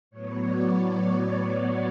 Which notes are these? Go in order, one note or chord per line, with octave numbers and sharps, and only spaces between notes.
A2 F#3 B3 C#5
D5
D5
C#5